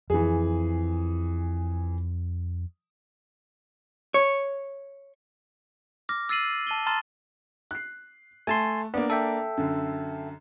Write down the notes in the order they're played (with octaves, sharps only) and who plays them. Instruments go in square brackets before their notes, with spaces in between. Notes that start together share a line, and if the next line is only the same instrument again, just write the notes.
[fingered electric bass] F2 [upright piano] E3 G#4
[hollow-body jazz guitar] C#5
[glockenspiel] D6 F6 A#6
E6 A6 C7 D#7 F#7
A5 D#7 G7
A5 A#5 C6 F6 A6
[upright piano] F#6 C7
[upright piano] A3 [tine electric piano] G#5 A5 C6
[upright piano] A#3 D4 [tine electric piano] B3
[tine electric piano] A4 E5 G5
[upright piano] F#2 D3